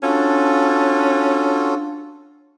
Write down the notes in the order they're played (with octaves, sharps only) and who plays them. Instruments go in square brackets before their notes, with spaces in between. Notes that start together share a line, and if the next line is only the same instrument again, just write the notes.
[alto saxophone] C#4 [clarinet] D4 [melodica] F4 F#4 A4